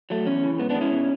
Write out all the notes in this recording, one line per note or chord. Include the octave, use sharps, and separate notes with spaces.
F#3 A3
E2 C#4
C#3 E3
G#2 B3
B3 D4
G#3
C#4 E4
B2